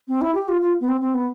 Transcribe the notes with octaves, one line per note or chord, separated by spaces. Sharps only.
C4
E4
G4
F4
F4
B3
C4
C4
B3